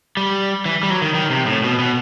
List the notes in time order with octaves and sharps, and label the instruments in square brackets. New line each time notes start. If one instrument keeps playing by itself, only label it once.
[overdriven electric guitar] G3
E3
G3
F#3
D#3
D#3
C3
A2
B2
B2